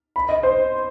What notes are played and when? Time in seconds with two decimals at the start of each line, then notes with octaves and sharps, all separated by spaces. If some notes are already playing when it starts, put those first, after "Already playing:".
0.16 B5
0.29 D#5
0.43 C5